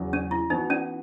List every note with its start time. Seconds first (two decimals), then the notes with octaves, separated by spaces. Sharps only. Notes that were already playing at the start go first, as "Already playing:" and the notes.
Already playing: E2 C#3 F#3
0.13 C#4
0.31 E4
0.50 E3 B3 D#4 F#4
0.70 C#4